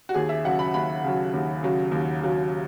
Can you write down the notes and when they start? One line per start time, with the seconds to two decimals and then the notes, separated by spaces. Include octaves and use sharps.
0.09 F#4
0.14 D#2 G#4
0.29 E5
0.45 C#3 F#3 F#5
0.59 B5
0.74 D#2 B5
1.04 C#3 F#3
1.34 D#2
1.63 C#3 F#3
1.92 D#2
2.22 C#3 F#3